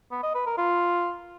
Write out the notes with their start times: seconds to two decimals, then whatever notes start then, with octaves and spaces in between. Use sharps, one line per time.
0.11 B3
0.23 D#5
0.35 B4
0.46 A#4
0.58 F4